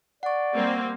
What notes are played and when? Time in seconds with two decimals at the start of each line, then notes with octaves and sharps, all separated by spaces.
0.23 D5 F#5 C#6
0.54 G3 A#3 C4